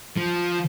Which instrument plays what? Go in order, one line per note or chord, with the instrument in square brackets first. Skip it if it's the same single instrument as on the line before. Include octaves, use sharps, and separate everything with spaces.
[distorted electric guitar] F3